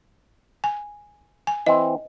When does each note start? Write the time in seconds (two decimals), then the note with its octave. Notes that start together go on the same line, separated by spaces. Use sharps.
0.64 G#5
1.47 G#5
1.66 E3 C4 D#5